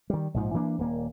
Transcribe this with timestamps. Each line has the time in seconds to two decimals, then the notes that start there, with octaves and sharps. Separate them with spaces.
0.10 D#3 G3
0.34 A#1 G#2 F3
0.54 E3 A#3 D4
0.78 D#1 A#3